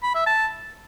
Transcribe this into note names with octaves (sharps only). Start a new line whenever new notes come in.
B5
E5
A5